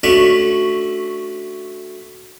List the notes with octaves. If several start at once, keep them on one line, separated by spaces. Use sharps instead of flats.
A3 C#4 D4 F#4 E5